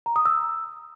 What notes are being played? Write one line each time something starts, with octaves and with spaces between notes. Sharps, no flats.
A#5
D#6
E6